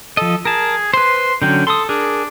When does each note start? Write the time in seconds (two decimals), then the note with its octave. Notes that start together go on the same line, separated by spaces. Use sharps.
0.17 F3 A4 D#5
0.45 G#4 A#4 A5
0.94 B4 C5 C6
1.42 D3 F#3 C#4 G5
1.67 A4 C6 D#6
1.89 D4 G#4 A#4